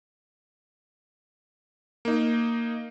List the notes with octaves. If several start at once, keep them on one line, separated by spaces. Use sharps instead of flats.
A#3 D#4